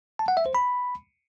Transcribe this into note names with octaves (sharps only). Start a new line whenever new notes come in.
A5
F#5
E5
C5
B5